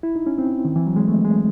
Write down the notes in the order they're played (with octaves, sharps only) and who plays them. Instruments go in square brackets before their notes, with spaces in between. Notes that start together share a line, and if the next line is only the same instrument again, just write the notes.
[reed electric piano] E4
D#4
C#4
C4
D#3
E3
F#3
G#3
A3
G#3